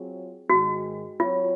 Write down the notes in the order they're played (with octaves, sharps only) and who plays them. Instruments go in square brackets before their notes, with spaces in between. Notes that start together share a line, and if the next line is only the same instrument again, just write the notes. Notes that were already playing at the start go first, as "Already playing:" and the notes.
Already playing: [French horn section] F#3 C4 F4 G#4 C#5
[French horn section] G#2 D#3 G#3 [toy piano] F#4
[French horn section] F#3 C4 F#4 C#5 [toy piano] F4